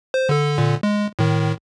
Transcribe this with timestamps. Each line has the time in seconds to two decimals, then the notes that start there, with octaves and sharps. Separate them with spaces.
0.14 C5
0.29 D3 A4
0.58 A#2 D3
0.83 G#3
1.19 A2 D#3